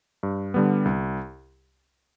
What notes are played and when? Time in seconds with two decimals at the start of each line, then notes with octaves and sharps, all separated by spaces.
0.23 G2
0.54 D3 G3 B3
0.85 C2